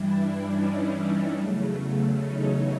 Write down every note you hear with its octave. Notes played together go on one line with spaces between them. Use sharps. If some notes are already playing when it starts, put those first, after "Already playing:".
Already playing: G2 E3 G3 D4 E4
D4
C#4 D#4
D4 E4
E2 C#3 F#3 A3
C#4 D#4